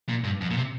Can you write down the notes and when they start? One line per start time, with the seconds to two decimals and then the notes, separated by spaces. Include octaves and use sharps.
0.09 A#2
0.24 G2
0.41 F2
0.51 A#2
0.57 C3